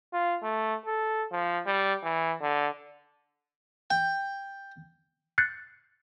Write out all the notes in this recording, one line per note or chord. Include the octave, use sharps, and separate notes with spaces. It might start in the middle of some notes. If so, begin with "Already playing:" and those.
F4
A3
A4
F3
G3
E3
D3
G5
F#6 G6 A6 C7 C#7